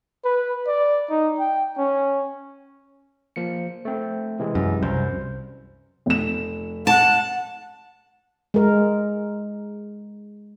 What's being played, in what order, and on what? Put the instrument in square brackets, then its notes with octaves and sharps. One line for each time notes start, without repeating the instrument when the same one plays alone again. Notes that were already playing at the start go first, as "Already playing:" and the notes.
[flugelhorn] B4
D5
D#4
G5
C#4
[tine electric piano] F3 A#3 C#7
A3 C4
C3 E3 G#3
[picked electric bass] F#2
[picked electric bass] C2 F#2 [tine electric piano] C5
[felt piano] F1 E7
[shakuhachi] F#5 [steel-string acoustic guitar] A5
[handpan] G#3 A#4